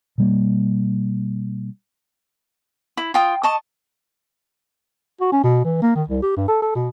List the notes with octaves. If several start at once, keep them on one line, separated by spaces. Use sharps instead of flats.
B2 G3 A#3
E4
F4 G5 D#6
D#5 A5 C#6
F#4
C#4
B2
E3
A#3
D#3
C2
G4
G2
A4
A4
B2